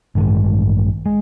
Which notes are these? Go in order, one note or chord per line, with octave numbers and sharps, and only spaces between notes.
A1 G2 D#3 G#3
G#3